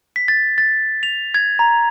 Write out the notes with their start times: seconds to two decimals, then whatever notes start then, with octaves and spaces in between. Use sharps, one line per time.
0.16 B6
0.28 A6
0.58 A6
1.03 F7
1.34 G#6
1.59 A#5